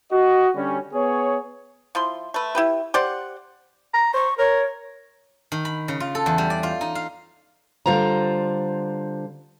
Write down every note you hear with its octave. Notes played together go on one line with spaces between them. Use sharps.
F#4 D#5
D3 G3 C#4
B3 G#4 C#5
F3 E4 C6
A3 B4
E4 G4 B4
G4 C5 D5 F#5
A#5
C5 C#6
A#4 C#5
D#3
B5
C#3
F4
A4
E2
G3
D5
F4
D#4
F5
D3 G3 F4 C5 A#5